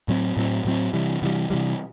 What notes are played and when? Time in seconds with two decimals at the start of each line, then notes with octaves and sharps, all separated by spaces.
0.08 A2 F#3 C4
0.37 A2 F#3 C4
0.65 A2 F#3 C4
0.93 C3 E3 G3
1.22 C3 E3 G3
1.50 C3 E3 G3